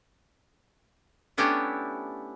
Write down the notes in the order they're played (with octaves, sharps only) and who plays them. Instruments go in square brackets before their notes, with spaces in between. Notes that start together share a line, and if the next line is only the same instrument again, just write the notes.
[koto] A3 B3 C#4 D4 E4 G4